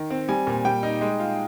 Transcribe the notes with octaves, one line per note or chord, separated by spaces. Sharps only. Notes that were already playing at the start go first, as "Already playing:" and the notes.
Already playing: D#3
C4
G3 G#5
A#2
G3 G5
D#4
G#3
F4